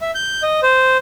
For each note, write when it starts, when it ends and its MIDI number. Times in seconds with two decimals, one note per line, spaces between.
0.01 0.11 76
0.15 0.42 91
0.43 0.61 75
0.63 0.97 72